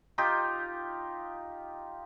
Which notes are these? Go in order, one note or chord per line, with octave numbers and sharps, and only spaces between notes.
D#4 F4 G4